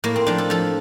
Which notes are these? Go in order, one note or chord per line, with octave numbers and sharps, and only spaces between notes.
A2 A#3
C4
F3 D4
A4
F3 A4